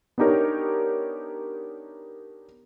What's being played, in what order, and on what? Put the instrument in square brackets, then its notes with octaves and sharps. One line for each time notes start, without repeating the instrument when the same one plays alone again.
[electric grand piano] B3 D4 D#4 G4 A#4 C#5